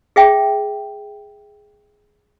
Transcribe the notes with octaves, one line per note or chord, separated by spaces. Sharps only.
G#4 E5 G5